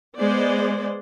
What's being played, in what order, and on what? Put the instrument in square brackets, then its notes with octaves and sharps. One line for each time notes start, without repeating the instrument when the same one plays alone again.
[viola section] G#3 B3 C5 D5